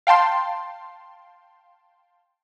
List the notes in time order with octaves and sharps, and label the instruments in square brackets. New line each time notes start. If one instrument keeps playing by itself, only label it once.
[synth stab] F5 G5 A5 C6